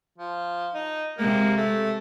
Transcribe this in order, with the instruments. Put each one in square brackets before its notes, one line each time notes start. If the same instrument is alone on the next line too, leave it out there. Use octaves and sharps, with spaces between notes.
[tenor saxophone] F3
D#4
[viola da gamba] C3 G#3 [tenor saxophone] A#3
[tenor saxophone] A3